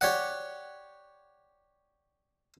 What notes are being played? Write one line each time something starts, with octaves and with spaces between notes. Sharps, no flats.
G4 C#5 D5 F#5